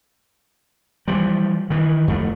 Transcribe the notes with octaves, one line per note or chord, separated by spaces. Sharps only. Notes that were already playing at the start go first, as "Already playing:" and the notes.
E3 F3 G3
D#3 E3
F2 A3